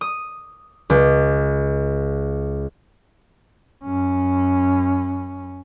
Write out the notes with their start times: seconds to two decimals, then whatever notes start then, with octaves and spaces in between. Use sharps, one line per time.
0.01 D#6
0.90 C#2
3.83 F#2 C#4